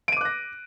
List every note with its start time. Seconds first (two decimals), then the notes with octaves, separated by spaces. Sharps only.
0.08 D7
0.12 D#7
0.17 D6
0.21 F#6
0.25 A#6